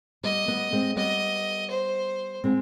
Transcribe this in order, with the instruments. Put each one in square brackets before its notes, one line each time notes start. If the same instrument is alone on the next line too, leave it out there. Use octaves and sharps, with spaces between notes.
[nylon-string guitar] G3 B3 [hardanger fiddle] D#5
[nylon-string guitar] G3 B3
G#3 C4
[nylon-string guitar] G3 B3 [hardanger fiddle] D#5
[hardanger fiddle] C5
[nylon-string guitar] G#3 C4